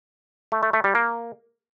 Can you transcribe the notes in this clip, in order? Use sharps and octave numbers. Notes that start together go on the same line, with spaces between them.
A3
A3
A3
G3
A#3